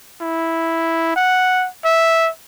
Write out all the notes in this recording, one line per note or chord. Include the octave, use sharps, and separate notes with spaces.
E4
F#5
E5